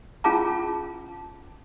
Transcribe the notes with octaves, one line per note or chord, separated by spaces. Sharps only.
C#4 F4 G#4 A5 A#5